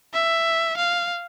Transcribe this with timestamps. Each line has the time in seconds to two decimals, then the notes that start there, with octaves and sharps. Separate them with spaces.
0.14 E5
0.77 F5